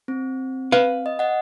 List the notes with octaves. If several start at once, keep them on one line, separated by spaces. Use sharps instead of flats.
C4
B4 F5
D#5
D#5 F#5